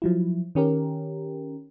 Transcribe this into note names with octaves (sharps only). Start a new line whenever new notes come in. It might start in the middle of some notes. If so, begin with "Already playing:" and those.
F3 F#3 E4
D#3 C#4 G4 A#4